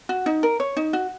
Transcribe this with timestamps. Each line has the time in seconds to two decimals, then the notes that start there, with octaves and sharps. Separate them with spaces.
0.09 F#4
0.26 D#4
0.43 A#4
0.60 C#5
0.77 D#4
0.93 F#4